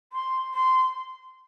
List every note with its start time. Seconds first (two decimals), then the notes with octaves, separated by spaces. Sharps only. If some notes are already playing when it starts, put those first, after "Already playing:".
0.13 C6
0.54 C6